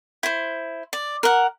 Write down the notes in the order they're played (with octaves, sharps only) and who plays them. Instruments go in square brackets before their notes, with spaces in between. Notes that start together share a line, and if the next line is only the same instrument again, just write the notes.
[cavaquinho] E4 C5
D5
A#4 F#5